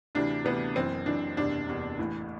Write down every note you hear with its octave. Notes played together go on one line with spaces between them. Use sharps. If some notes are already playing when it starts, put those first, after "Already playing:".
D2 C3 E3 D4
D2 C3 E3 B3
F#1 F#2 E3 C4
F#1 F#2 E3 D4
F#1 E2 C3 D4
F#1 E2 C3
A1 A2 E3